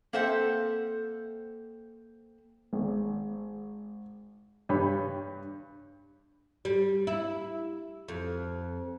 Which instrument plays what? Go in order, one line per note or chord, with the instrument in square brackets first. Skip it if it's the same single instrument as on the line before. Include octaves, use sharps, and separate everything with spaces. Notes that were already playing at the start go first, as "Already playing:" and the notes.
[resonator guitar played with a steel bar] A#3 C4 A4 C5 E5 F#5
[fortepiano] G#1
G2 G4 C#5 B5
[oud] G3
E4
F2